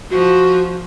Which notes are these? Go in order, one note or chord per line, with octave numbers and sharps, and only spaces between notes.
F3 F#4